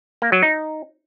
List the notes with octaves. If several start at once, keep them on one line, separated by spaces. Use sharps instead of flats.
A#3
F#3
D#4